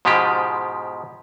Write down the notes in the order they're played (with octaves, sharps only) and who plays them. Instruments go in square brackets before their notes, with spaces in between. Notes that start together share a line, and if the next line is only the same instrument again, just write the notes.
[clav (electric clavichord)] G#2 B2 F3 G#3 G4